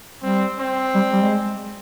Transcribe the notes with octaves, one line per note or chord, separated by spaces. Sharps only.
G3 C4
C4
G3
G3
G#3